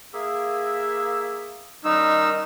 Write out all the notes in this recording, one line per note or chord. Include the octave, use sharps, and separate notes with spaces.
A#3 G#4 E5
D#3 G3 C#4 D#4 E6